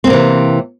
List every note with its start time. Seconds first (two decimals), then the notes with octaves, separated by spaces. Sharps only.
0.04 C4
0.07 A#3
0.10 C3
0.13 E3